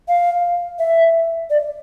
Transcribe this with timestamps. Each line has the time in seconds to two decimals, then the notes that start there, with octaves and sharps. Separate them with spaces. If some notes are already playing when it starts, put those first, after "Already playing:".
0.08 F5
0.79 E5
1.50 D5